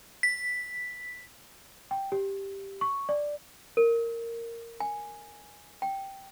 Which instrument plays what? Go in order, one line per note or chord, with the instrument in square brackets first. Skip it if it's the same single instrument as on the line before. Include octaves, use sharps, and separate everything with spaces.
[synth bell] B6
[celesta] G5
G4
C#6
D5
[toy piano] A#4
G#5
G5